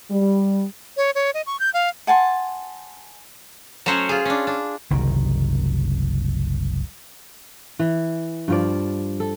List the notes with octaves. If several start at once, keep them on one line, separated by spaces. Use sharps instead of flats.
G3
C#5
C#5
D#5
C#6
G6
F5
F#5 G#5 A5 C6
F#3 A3 C#4 C5 C#5 F#5
F4 G#4
C#4 D4
D4
F#1 C2 D#3
E3
G2 F3 D5
A4